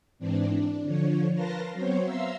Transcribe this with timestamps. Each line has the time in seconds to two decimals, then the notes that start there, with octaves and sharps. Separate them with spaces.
0.19 G#2 E3 C4 D4
0.50 D4
0.84 D3 F3 C#5
1.35 A#4 B4 F5 A5 C6 A#6
1.73 F#3 B3 C4 C5 C#5
2.04 E5 F5 A#5 C6 E6